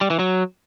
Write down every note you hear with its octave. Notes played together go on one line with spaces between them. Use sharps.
G3
E3
F#3